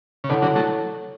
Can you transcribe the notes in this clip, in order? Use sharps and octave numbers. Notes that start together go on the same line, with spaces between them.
C#3
B2 D3 E4 A4 C#5 F#5 A5
D3 F#3
F#3 A3